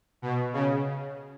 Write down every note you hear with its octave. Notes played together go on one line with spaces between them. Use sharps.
B2
C#3